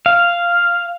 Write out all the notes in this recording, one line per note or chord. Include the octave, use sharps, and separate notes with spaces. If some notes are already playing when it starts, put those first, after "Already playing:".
F5